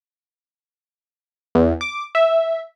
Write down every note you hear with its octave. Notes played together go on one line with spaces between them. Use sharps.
E2
D6
E5